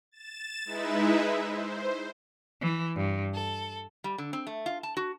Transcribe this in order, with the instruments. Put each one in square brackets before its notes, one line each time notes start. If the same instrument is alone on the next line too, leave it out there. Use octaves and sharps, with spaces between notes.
[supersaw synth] A6 E7
G#3 D#4 E4 B4 E5
C5
[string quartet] E3
G2
A4
[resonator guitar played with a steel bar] G3
D3
C4
A3
F4
A5
F#4